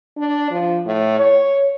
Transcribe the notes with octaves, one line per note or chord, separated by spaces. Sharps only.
D4
F3
A2
C#5